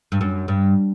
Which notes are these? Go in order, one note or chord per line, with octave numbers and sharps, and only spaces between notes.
G2
F#2
G2